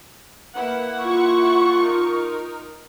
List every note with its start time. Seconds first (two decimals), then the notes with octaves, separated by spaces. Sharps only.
0.55 A#3 E4 B4 F#5
1.02 F4 C#6
1.80 D#4 A#4